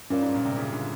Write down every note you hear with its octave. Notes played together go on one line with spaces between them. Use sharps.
G2 C#4 F4 A#4 D5 F5
G#2
A#2
C3
C#3
D3